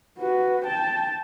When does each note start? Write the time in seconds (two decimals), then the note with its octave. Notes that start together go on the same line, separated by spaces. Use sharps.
0.18 F#4 B4
0.64 G5 A5